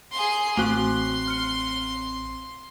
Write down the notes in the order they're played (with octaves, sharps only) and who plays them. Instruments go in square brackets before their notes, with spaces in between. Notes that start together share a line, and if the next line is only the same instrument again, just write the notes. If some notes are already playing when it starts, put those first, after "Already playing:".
[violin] G#4 C6
[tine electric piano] A1 C4 F#6 [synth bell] A3 F#4 C#6 [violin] C6
[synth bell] F6 C#7